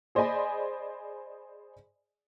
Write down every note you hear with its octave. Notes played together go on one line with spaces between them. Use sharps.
G#4 C5 D5 D#5 G#5 B5